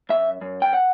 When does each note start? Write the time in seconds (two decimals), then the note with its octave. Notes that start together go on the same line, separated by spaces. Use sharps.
0.09 F#2 E5
0.41 F#2
0.62 G5
0.73 F#5